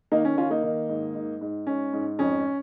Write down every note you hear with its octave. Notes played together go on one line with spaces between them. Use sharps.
D#3 A#3 D#4
C#4
D#3 C#4 F4
A#3 D#4
D#3
G#2
G#2
G#2
G#2 C#4
G#2
F2 C#4